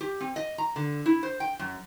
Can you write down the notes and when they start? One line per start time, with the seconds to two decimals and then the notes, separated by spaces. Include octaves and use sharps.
0.01 G4
0.21 C4
0.36 D#5
0.58 A#5
0.76 D3
1.06 E4
1.23 C5
1.40 G5
1.59 F#2